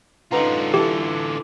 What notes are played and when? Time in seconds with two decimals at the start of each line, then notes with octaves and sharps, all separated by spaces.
0.32 D3 C#4 D#4 F4 B4 F#5 A#5
0.74 E3 G4 A4